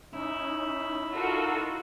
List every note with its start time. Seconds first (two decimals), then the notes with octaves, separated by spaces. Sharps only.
0.13 C#4 D#4 E4
1.13 D#4 F4 F#4 A4 A#4 E6